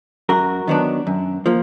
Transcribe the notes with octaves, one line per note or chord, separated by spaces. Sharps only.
F#2 F#4 A#4
D#3 F#3 B3 D4
F#2
F3 A#3